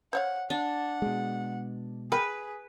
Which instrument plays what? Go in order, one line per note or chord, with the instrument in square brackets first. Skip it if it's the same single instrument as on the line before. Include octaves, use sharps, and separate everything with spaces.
[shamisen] C5 C#5 F5 [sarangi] F#5
[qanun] D4 [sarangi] F#5
[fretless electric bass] B2 G#3
[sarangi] G#4 [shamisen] A#4 G5 B5 [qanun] B4